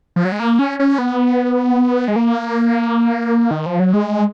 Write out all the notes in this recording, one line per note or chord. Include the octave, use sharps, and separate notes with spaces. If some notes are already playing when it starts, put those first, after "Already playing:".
F3
F#3
G#3
A#3
C#4
C#4
B3
G#3
A#3
D#3
F3
F#3
G#3